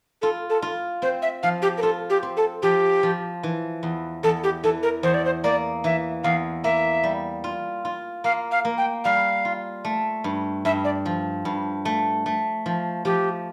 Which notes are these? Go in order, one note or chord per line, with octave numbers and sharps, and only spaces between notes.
F4 A4
A4
F4
C4 C5
E5
F3 F5
G4
A#4
F4 A4
G4
C4
A4
F3 G4
F3
E3
E2
E2 A4
G4
E3 A4
A#4
E2 C5
D5
C5
A#3 D5
E3 E5
E2 F5
A#3 E5
G3
F4
F4
A#3 F5
F5
A#3
G5
G3 F5
F4
A3
G2
G2 E5
D5
F3
G2
A3
A3
F3
F3 G4